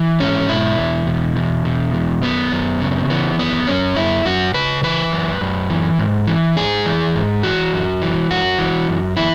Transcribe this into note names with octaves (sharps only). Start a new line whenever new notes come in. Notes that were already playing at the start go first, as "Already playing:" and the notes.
Already playing: E3
G#2 C#4
B2 E4
E2
B2
E2
B2
E2
F#2 B3
F#2
C#3
E3 B3
F#2 B3
F#2 C#4
F#2 E4
F#2 F#4
C#3 B4
E3 B4
F#2
F#2
E3
G#2
E3
G#2 G#4
E3
G#2
E3 F#4
F#2
E3
F#2 F#4
E3
F#2
E3 E4